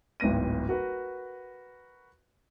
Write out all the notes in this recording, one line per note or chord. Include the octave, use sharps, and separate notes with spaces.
D1 G#1 B3 A#6 D#7
F#4 A#4 B4